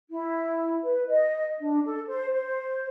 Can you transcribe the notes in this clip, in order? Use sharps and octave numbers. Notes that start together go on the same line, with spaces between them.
E4
B4
D#5
D4
A4
C5
C5